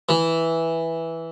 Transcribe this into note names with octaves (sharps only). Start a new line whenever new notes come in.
E3